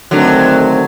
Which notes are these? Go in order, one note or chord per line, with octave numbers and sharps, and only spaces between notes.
D3 D#3 F#3 A3 C4